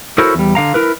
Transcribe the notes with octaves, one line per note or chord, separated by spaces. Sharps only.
E4 F#4 A4 A#4 C5 C#5
E2 G3
D3 F5 A#5
E4 A#4 B4